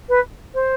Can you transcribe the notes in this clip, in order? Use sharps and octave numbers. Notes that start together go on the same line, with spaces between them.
B4
C5